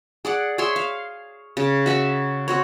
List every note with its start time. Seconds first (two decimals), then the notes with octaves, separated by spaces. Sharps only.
0.25 G#4 D5 F#5
0.58 G#4 C#5 E5 C6
0.76 F5
1.57 C#3
1.86 F#4 E5 G#5 C#6
2.48 C4 F#4 C#5